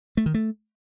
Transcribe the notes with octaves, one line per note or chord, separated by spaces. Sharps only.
A3
D#3
A3